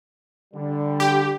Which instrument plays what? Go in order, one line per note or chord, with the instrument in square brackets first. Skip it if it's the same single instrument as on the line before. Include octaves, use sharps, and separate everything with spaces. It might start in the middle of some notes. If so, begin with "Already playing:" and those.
[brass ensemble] D3 G3
[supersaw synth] G4